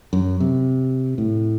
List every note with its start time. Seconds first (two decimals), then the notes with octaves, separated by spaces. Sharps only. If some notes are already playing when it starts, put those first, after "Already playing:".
0.13 F#2
0.40 C3
1.18 A2